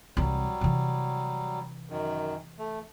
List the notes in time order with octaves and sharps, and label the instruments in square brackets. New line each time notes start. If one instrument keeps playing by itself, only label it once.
[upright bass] C2 E3 [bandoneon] F#3 G3
[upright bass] C3 E3
[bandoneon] F#2 D#3
A3